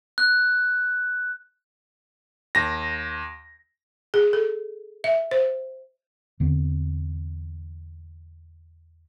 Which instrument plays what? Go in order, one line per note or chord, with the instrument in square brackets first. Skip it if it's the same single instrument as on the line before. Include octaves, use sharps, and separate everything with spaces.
[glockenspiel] F#6
[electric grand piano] D#2 A#6
[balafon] G#4
A4
E5
C5
[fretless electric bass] E2 D3 C4